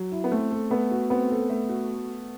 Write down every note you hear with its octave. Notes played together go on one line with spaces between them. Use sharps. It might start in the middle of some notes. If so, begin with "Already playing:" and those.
Already playing: F#3
E4
B3
A3 C4
A4
A3 B3
F#4
B3 C4
A4
A3
F#4